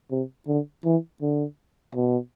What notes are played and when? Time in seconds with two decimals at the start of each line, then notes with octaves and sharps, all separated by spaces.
0.11 C3
0.47 D3
0.85 E3
1.22 D3
1.95 B2